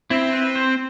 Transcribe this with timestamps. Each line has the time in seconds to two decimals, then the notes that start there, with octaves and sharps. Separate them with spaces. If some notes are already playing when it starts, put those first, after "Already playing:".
0.10 C4 E4
0.33 B4
0.56 C5